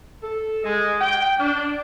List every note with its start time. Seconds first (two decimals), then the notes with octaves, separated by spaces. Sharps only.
0.22 A4
0.64 G#3
1.00 G5
1.38 D4